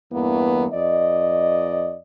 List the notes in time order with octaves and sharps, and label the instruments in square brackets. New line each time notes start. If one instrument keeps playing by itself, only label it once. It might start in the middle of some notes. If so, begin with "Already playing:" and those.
[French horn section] E2 G2 E3 A#3 B3
F2 D5 D#5